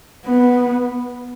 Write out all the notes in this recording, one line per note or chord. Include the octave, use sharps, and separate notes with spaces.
B3